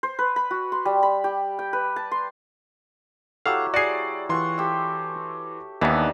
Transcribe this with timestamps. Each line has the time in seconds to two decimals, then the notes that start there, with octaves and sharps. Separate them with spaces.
0.03 C5
0.19 B4
0.36 B5
0.51 F#4
0.72 C6
0.85 G3
1.03 B5
1.24 G4
1.59 G5
1.73 B4
1.96 A5
2.11 C6
3.46 F#3 E4 G4 A4 F5 F#5 E6
3.74 F#4 G#4 D5 C7
4.29 E3 F4 F#5 C6 C#6
4.58 G4 A4 E5
5.81 D#2 E3 B3 D4 D#4 B4